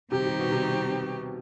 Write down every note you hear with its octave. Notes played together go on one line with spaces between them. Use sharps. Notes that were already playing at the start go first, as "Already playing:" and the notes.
C3 D#3 G3 C4 D#4 G4
C3
B2
C3